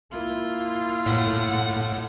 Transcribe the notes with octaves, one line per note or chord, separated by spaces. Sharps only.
A#3 E4 F4
A2 F#5